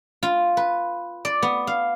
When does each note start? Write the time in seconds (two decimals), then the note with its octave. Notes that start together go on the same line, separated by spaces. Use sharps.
0.23 F4
0.57 B4
1.25 D5
1.42 B3
1.67 F5